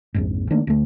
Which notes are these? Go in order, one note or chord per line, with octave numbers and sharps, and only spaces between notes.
A#1 F2 G#2
D#3 A3 A#3 D4
D2 A3